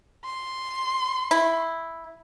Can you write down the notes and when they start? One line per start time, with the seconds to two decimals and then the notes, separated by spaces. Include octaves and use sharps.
0.25 C6
1.31 E4